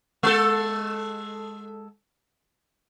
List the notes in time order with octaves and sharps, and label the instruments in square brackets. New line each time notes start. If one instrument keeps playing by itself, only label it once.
[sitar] G#3 A4